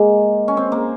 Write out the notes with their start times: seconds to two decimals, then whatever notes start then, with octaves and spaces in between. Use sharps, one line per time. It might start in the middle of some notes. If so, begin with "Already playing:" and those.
Already playing: G#3 A#3
0.48 C#4
0.57 C4
0.72 A#3